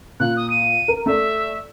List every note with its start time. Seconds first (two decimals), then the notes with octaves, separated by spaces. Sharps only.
0.20 A#2 F#6
0.37 D#6
0.50 D#7
0.88 A#4
1.06 A3 D5 E5